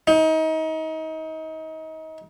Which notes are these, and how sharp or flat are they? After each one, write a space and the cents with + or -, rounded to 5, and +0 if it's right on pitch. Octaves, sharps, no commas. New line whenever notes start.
D#4 +30